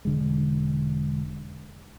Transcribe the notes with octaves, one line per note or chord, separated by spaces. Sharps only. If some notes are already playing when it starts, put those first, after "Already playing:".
E1 D3 G#3